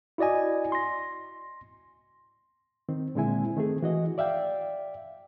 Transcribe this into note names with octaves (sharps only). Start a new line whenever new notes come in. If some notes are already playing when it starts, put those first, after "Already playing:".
E4 F#4 D5 D#5 G#5
C6 A#6
D#3 C4
A#2 D3 G#3 C4 E4 G#5
D#3 A3 C4 G#4
E3 F#4 D#5
D5 E5 F5 G5